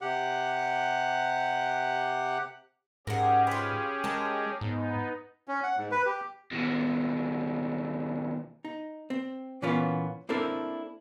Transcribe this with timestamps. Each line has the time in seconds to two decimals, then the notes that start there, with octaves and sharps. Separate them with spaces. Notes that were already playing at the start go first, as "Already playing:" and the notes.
0.02 C3 G4 F#5 F#6
3.07 G#2 C#4 G4 G#4 A#4 F#5
3.47 F4 B4
4.04 G#3 A#4 A5
4.61 G#2 B3 D#4
5.48 C#4
5.63 F#5
5.77 G#2
5.91 B4
6.06 G4
6.51 D#2 B2
8.65 D#4
9.10 C4
9.62 A#2 E3 A#3 B3 C#4 F4
10.29 A#3 C4 D4 E4 A4 A#4